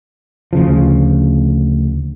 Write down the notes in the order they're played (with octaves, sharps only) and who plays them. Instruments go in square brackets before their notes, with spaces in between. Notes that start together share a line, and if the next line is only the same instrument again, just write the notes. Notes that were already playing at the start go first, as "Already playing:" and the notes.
[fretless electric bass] D2 C#3 F3